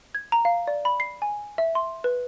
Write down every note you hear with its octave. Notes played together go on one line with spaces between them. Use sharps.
G#6
A#5
F5
D5
B5
C7
G#5
E5
C6
B4